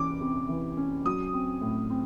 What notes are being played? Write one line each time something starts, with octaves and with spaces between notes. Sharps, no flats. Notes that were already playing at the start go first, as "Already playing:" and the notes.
Already playing: C3 E3 C#4 D6
C3
E3
C#4
F#3 D#6
C4
A2
C4